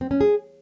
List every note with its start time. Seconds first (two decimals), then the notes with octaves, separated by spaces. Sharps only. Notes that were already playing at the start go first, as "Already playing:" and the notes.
0.01 C4
0.11 C#4
0.21 G#4